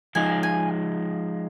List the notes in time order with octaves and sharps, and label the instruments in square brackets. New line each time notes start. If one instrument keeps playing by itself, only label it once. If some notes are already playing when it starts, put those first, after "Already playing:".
[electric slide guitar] F3 G#3 D#4 [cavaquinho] G#5
[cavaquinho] G#5